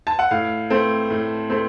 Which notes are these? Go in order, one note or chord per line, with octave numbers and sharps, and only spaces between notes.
A5
F#5
A2 F5
A3 C4
A2
A3 C4